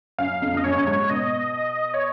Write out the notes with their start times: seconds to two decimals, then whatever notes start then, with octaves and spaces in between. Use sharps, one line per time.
0.18 F#2 F5
0.42 F2
0.53 F2 D#5
0.64 F#2 C#5
0.76 F#2
0.87 G#2
1.10 B2 D#5
1.94 C#5